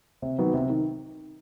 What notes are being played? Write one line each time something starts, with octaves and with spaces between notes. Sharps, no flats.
C3
D#3 F#3 B3
C3
D#3